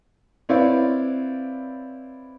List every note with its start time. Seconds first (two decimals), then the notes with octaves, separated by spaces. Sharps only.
0.49 C4 E4 B4 C#5 D5 F5